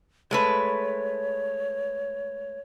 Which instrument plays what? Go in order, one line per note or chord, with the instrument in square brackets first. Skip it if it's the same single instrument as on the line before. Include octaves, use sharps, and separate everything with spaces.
[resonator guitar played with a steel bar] G#3 A3 B4 [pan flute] C#5